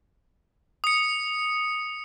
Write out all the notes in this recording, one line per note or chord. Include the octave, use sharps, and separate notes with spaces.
D#6 C#7